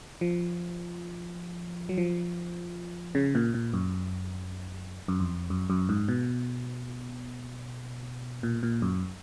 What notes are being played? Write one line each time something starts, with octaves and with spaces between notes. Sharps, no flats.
F3
F#3
F3
C#3
A#2
A#2
F#2
F#2
F2
F#2
F#2
G#2
B2
A#2
A#2
F#2